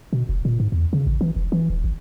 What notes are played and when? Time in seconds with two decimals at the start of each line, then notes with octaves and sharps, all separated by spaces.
0.13 B2
0.29 F1
0.45 A#2
0.60 G#2
0.72 E2
0.93 C#3
1.07 A1
1.21 E3
1.36 F1
1.52 E3
1.70 D#1
1.84 G#1